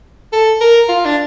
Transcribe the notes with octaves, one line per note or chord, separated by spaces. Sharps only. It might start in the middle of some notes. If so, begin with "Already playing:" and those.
A4
A#4
F4
D4